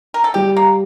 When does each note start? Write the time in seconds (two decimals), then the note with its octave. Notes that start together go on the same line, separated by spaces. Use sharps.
0.14 A#4
0.24 A4
0.34 G3 G4
0.57 A#3